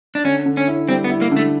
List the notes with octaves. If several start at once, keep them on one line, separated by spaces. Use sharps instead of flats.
D4
D3 C#4
D3
C#4
E4
G3 C4
B3
E4
A#3
D3
A3